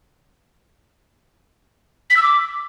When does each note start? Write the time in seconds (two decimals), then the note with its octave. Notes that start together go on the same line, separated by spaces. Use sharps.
2.10 B6
2.17 E6
2.23 D6